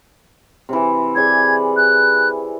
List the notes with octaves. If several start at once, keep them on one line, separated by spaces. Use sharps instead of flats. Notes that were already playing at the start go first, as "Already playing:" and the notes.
C3 E3
G#4 D5 G#6
F#6